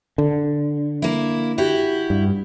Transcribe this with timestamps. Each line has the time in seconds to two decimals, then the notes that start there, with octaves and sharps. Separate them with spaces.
0.18 D3
1.02 A#3 E4
1.58 E4 F#4 G4
2.10 G2